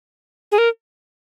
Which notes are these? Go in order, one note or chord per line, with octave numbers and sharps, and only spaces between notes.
G#4
A#4